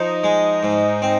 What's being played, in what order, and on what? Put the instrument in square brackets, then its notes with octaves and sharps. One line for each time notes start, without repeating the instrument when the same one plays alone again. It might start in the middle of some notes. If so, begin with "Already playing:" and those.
Already playing: [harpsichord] F3 [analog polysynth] D#4
[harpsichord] G#3
G#2
C4